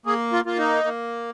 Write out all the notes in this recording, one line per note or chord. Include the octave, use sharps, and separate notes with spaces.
A#3 G#4
F4
A#3 F4
D#4
A#3